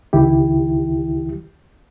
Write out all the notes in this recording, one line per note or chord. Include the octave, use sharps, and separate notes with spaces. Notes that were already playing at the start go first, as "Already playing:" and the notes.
C#2 D#3 E4 G4